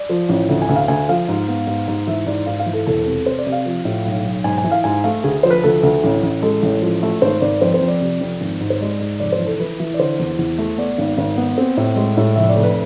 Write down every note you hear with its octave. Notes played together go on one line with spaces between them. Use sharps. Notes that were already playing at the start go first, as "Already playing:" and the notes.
Already playing: D5
F3
A1
D2
G#5
D2
F5
D2 G#5
F3 F5
G#2
B3
G#2
G#2
E3 E5
G#2 D5
G#2 F5
F5
E3
A4
E1 A4
C3
C3 C5
D5
C3
F5
F3
A2
B1
B1
G#2 G#5
G#5
E3
F5
G#2 G#5
A3 F5
D2 G#4
F3 C5
B4
D2 A4
D2
A1
A1
G#3 A4
A1
F3
A3
G#1 C5
G#1 D5
F2 C5
C5
F2
D5
C3
F2
G#1
G#2
C5
G#3 D5
G#2
F1 D5
C5
E3
A4
E3 B4
E3
D5
D3 C5
E2
E2
A3
B3 D5
G#1
G#1
B3
C4
A2
G#3
A2
F1 E5
D5
F1
B4